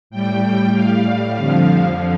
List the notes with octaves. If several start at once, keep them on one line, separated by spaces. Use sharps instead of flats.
A2 G3 G5
F5
F2 D3 F3